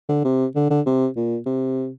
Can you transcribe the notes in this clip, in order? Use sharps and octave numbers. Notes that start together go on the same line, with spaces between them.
D3
C3
D3
D3
C3
A#2
C3